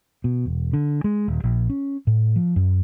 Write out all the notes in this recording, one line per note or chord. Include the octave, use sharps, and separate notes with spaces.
B2
E1
D3
G#3
D#1
A#1
C#4
A2
F3
F#2